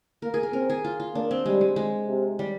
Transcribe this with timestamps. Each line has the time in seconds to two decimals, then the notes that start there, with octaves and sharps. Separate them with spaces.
0.22 A#3 A#4
0.34 G#4
0.43 A#4
0.53 C4 A#4
0.70 G#4
0.84 F4
1.00 F4
1.15 A#3 D4
1.31 C4
1.46 G3 G#3
1.61 G#3
1.76 G#3
2.07 C3
2.39 G3